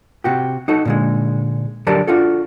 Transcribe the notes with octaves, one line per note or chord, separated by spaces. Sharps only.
C3 F#4 G4
D#4 F#4 A4
A#2 D3 G#3
D3 F#3 G4 A#4 D5 A5
D4 F4 F#4 A4